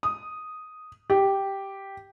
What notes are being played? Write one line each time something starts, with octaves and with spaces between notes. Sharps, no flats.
D#6
G4